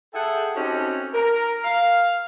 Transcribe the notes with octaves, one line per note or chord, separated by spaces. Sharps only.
G#4 A4 E5 F#5 G5 A5
C4 C#4 D#4 F#4 G4 A4
A#4
F5